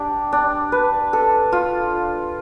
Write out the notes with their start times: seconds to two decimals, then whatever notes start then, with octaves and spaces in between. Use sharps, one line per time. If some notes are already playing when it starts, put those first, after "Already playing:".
Already playing: D4 G4
0.32 D4
0.72 B4
1.13 A4
1.52 F4